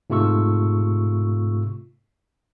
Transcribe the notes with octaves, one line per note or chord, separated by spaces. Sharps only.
G#2 C3 A3 F4 C#6 E6